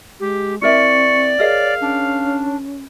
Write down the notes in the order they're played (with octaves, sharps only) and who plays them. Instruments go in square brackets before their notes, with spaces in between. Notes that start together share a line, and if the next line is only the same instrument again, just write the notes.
[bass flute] G#3 [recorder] G4
[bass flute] C4 [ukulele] E4 A#4 E5 [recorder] D5 [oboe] C#6
[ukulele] G#4 A#4 D#5 [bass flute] C#5 [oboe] F5
[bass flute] C#4 [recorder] D4